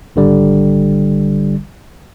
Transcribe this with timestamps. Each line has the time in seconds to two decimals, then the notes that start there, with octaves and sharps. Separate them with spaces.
0.16 G#1 D3 G3